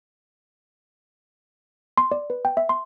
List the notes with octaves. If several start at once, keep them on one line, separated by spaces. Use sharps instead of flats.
C6
D5
B4
G5
E5
C6